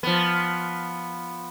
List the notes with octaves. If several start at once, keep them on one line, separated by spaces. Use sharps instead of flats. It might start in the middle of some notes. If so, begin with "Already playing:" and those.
F3 B3